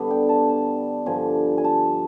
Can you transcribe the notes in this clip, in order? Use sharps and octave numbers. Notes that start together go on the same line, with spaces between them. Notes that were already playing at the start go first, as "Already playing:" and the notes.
Already playing: D3 G3 B3
G5
A5
A5
G2 D3 F3 G#5
G#5
A5